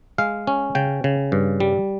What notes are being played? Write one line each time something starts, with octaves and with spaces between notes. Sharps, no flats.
G#3 F5
C#4
C#3 G5
C#3
G2
G3